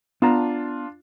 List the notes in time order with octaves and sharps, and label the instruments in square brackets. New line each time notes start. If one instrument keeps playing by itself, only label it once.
[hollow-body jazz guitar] B3 A5 A#5 [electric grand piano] D4 F4